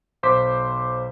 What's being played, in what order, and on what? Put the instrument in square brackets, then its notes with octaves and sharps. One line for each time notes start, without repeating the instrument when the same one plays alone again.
[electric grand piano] B1 C5 D6 B6